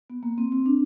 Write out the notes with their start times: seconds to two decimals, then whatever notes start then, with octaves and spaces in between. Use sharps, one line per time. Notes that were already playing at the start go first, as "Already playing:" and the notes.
0.10 B3
0.23 A#3
0.38 C4
0.52 C4
0.66 D4